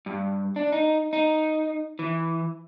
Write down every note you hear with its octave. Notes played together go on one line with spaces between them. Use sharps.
G2
D4
D#4
D#4
E3